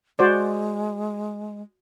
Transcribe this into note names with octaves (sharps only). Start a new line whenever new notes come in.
G#3 F#4 C5 D5